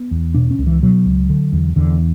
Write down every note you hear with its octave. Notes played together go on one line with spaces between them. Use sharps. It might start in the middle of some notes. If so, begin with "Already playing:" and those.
Already playing: B3
E2
B2 D4
C#4
C#2
E3
B2 F#3
C#2
D3
E2
E2 D3